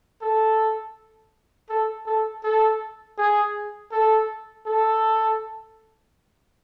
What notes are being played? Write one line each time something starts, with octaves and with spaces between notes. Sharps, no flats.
A4
A4
A4
A4
G#4
A4
A4